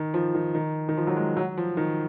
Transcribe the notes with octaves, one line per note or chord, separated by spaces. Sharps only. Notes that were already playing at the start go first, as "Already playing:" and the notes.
Already playing: D#3
F3
D#3
D#3
D#3
F3
F#3
G#3
F#3
F3
D#3